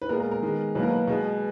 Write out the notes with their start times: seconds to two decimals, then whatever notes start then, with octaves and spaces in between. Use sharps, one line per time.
0.02 B4
0.09 A#2 G#3 B3 A#4
0.20 A#4
0.31 A#4
0.42 D#3 G#3 B3
0.75 B2 F#3 A#3 B4
0.83 A#4
0.90 B4
1.08 B2 G#3 B3